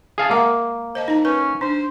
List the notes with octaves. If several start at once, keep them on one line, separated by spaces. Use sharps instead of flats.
G#4 F5 A5
G#3 A#3 A#4 F#5
C5 D#5 A5
D#4 A#5
C#4 B4
D4 C5